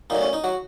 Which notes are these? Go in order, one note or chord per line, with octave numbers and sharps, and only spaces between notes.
A#2 F#3 A3 D#4
C#4
D#4
F#3 F#4